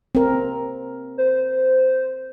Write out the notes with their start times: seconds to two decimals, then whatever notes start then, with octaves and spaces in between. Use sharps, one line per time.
0.15 C4 A#4
1.18 C5